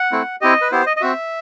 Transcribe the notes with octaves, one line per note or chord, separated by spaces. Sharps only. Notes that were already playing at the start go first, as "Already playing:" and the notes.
Already playing: F#5
A3 C4 E4
C4 E4 G4 D#5
B4
B3 E4 G4 C5
D#5
D#5
C4 F#4 E5